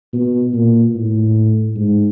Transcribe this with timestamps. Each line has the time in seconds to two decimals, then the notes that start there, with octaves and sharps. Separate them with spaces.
0.13 B2
0.54 A#2
0.95 A2
1.76 G#2